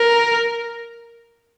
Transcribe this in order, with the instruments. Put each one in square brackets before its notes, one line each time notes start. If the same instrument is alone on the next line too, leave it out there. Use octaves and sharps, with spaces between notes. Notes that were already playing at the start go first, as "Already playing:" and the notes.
Already playing: [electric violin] A#4